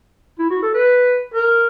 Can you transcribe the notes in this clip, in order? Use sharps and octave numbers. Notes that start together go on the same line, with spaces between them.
E4
F#4
A4
B4
A#4